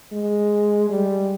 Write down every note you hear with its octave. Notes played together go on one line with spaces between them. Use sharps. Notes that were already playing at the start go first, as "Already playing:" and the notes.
G#3
G3